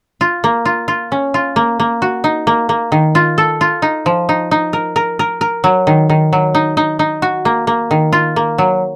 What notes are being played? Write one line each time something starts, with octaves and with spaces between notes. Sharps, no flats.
F4
A#3
F4
F4
C#4
F4
A#3
A#3
F#4
D#4
A#3
A#3
D#3
F4
A4
F4
D#4
F3
D#4
D#4
A#4
A#4
A#4
A#4
F#3
D#3
D#3
F#3
D#4
D#4
D#4
F#4
A#3
A#3
D#3
F4
A#3
F#3